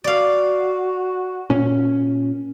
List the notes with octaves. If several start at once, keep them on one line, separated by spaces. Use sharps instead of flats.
F#4 D5 F5
A#2 C#4